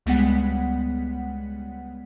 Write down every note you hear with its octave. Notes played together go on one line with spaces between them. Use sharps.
C#2 G3 G#3 B3 F#5 B6